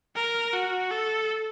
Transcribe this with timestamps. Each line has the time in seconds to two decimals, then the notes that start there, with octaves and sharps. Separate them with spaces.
0.16 A#4
0.53 F#4
0.91 A4